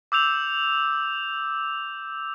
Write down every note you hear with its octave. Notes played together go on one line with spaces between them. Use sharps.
D6 E6 G6 F7